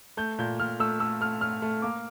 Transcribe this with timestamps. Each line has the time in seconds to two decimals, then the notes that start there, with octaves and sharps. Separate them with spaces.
0.17 A3 G6
0.39 A#2 G6
0.60 A#2 F6
0.80 A3 E6
1.00 A3 E6
1.21 A3 F6
1.41 A3 F6
1.62 A3
1.82 A#3 D6